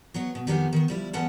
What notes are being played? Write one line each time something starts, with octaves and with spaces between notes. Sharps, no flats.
F#3 B3 C#5
B2
F2 D#3 B3 G4 F#5 G#5
D#3 B3
F3 G3 E4
E2 A#3 C#4 B4 F#5 A5